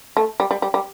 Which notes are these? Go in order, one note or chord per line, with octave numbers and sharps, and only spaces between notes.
A3
G3
G3
G3
G3